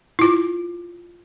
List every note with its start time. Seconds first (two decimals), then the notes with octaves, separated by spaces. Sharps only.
0.19 E4 F4